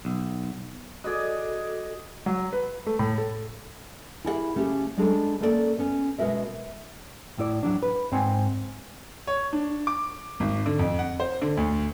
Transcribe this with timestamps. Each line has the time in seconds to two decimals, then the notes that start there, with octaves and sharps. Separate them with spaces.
0.05 B1
1.04 F#4 G#4 A4 D5 D#5
2.26 F#3
2.53 B4
2.87 A3
2.99 A2
3.18 A4
4.24 E4 G4 G#4 A#4 D5 F#5
4.55 C#3 A3 C#4 F4 G4 G#4
4.97 G3 G#3 D4 F#4 G#4 A4
5.40 A3 A#3 C#4 A4 B4 D5
5.79 B3 C#4
6.18 B2 G#3 F#4 A#4 E5
7.38 A2 E4 D5
7.63 F#3 G3 D4
7.83 B4
8.12 G#2 C4 F#5 G#5
9.27 C#5
9.53 D4
9.87 D6
10.40 G#1
10.66 D3
10.79 F2
10.99 F#5
11.20 C5
11.42 D3
11.57 D2